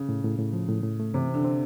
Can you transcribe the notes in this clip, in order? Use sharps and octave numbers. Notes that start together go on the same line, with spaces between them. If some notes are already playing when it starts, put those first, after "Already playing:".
Already playing: C#3
A2
A2
A2
F3
A2
A2
A3
C3 E3
D3 C4
C4